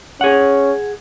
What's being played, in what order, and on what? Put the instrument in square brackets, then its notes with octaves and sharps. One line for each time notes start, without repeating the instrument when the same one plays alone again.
[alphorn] C#4 [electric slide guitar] G#4 F#5